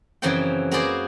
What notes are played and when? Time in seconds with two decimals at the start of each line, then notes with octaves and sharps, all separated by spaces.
0.22 F#2 C#3 E3 F3 C4 G5
0.71 A#3 F#4 G#4 B4 C5 D5